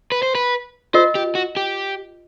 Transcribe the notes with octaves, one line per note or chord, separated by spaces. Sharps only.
B4
C5
B4
F4 A#4 C5 D#5
G4
F#4
G4